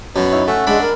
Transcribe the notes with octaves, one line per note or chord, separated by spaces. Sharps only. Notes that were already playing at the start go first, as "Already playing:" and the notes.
F#2 B2
D#4 E4 C#5
A3 C#4 E5 F#5
G#3 D4 B5
A#4